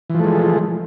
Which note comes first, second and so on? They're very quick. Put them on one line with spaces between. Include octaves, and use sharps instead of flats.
E3 F3 A3 G#3